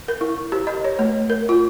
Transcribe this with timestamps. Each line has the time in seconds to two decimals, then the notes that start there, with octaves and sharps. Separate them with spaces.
0.08 A#4
0.21 E4
0.52 G4
0.67 D#5
0.85 C#5
0.99 A3
1.30 A#4
1.49 F4